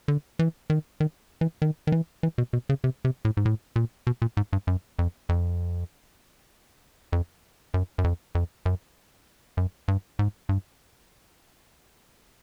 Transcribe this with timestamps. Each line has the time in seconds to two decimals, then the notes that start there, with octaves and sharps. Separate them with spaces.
0.08 D3
0.39 E3
0.70 D#3
1.00 D#3
1.41 E3
1.62 D#3
1.87 D#3
1.92 E3
2.23 E3
2.38 B2
2.53 B2
2.69 C#3
2.84 C3
3.05 C3
3.25 A2
3.37 G#2
3.45 A2
3.76 A#2
4.07 B2
4.22 A#2
4.37 G#2
4.53 G2
4.67 F#2
4.99 F2
5.29 F2
7.13 F2
7.74 F#2
7.98 F#2
8.04 F2
8.35 F2
8.66 F#2
9.57 F#2
9.88 G2
10.19 G#2
10.49 G2